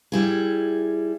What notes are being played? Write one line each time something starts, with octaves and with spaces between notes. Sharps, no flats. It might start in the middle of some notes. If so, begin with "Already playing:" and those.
G3 E4 G#4